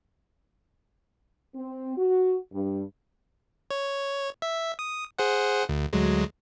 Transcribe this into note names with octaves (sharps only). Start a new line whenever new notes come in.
C4
F#4
G2
C#5
E5
D#6
G#4 C5 F#5
D2
D2 F#3 G#3